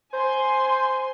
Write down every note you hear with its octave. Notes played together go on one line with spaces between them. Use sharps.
C5 G#5 C6